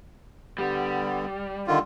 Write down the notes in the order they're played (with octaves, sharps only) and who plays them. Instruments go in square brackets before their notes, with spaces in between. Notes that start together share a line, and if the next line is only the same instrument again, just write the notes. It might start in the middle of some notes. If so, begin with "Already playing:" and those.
[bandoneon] D3 B3 [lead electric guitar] G3
[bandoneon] D3 D#3 F4